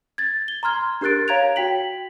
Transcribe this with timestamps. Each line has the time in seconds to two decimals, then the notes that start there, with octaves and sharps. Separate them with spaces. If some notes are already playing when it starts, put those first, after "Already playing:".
0.18 G#6 A6
0.48 G7
0.63 A#5 C6 F6 G#6
1.01 D4 G4 A#4 F#6 A6 D7
1.28 C#5 F5 A#5 G#6 D7 F7
1.56 F#4 G5 B6 F#7